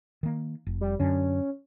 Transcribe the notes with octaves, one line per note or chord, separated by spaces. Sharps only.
D#3 A#3
F1
G3
F#2 D3 C#4